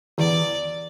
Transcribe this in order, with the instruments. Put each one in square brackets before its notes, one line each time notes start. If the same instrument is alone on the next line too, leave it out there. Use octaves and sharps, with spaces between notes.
[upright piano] E2 [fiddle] D5